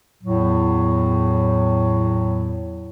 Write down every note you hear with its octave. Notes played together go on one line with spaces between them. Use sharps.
E2 A2 F#3